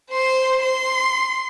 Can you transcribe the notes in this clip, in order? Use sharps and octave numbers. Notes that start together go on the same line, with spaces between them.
C5 C6
C6